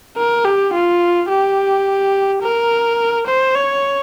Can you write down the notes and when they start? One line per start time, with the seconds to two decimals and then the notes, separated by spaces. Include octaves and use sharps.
0.17 A#4
0.45 G4
0.73 F4
1.30 G4
2.42 A#4
3.27 C5
3.55 C#5